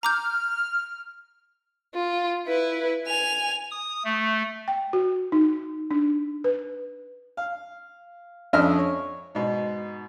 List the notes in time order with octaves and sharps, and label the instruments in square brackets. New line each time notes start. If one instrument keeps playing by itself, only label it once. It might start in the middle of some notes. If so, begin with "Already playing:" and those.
[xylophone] A#5 D6 G6 [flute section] F6
[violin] F4
E4 B4
G#5 F7
[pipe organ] D#6
A3
[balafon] G5
F#4
D#4
D4
B4
[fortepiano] F5
F2 C#4 D4 D#5 E5 F6
C#5
G#2 B2